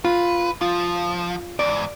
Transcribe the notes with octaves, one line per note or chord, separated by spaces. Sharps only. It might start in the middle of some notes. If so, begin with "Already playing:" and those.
F4 B4
F3 F4
E2 G#2 D5